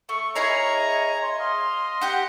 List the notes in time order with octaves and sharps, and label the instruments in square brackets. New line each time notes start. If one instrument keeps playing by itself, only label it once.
[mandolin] A3 [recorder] C#6
[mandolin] E4 G#4 A#4 [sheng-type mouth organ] C#5 A#5 [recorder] D#5
[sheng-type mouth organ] C#5 [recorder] C6
[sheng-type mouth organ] D#5 F5 [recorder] C6
[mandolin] G4 F#5